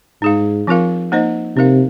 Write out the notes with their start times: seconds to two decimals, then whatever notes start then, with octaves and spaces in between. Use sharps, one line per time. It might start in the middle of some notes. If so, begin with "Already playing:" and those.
0.22 G#2 D#4 G#4 F5
0.67 F3 C4 F4 A#4 F5
1.12 A#3 D#4 C5 D#5
1.56 C3 D#4 A#4 F5